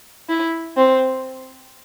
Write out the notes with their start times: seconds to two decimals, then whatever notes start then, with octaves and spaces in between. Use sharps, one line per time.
0.29 E4
0.77 C4